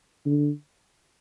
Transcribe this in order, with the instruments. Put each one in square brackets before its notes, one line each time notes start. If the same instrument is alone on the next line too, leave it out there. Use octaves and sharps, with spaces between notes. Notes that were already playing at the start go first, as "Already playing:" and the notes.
[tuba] D3